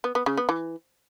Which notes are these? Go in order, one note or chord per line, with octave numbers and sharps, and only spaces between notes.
B3
B3
C#3
B3
E3